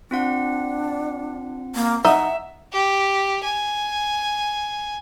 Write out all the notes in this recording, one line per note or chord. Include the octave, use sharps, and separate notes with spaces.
C4 D4 F4 F#5
A#3
D#4 E5 F#5
G4
G#5